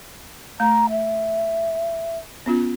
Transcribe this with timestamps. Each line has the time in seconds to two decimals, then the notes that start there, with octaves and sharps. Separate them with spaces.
0.60 A3 A#5
0.90 E5
2.46 B3 C#4 F4